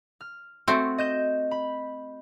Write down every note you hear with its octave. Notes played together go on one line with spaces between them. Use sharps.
F6
A3 C4 F#4
D#5 G6 E7
B5